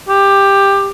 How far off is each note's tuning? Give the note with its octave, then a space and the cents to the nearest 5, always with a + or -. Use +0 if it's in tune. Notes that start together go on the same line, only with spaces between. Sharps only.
G4 +15